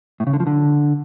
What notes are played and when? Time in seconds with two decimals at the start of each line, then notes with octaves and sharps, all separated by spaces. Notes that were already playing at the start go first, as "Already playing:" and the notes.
0.20 A2
0.27 C#3
0.33 D3
0.40 F3
0.47 D3